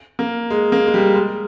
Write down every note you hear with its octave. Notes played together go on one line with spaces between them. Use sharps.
A#3
G#3
A#3
G#3
G3
G#3